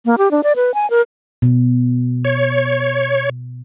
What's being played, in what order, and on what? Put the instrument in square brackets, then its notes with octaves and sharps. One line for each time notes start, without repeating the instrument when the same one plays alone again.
[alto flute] A#3
G4
D4
D5
B4
G#5
A#4
[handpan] B2
[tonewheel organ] C#5